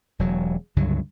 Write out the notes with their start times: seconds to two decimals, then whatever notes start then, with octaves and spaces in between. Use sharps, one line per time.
0.19 E1 F#3
0.76 C#2 G2 D3 F#3